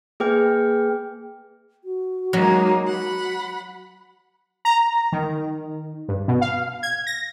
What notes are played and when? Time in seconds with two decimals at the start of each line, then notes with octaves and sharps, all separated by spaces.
0.20 A#3 G#4 B4 G5 F6
1.84 F#4
2.33 F#3 G#3 A#3 D#4
2.87 F#5 B5
4.65 A#5
5.12 D#3
6.08 G2
6.28 B2
6.41 F5
6.83 G#6
7.07 A#6